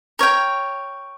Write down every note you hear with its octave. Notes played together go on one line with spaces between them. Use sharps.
A#4 C#5 G5